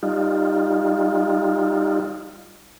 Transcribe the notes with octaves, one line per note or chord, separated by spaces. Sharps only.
G3 D#4 F4